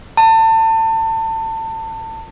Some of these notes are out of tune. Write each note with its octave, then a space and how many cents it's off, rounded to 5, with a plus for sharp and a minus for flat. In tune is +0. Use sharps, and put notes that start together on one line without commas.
A5 +30